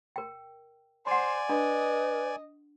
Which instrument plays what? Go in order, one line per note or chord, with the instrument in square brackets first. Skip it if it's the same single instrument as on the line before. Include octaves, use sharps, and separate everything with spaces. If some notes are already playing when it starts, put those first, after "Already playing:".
[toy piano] A#4 G5
[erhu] C5 [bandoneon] D5 G#5 [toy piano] F#5 C6
[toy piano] D4 [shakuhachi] B4 [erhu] D#5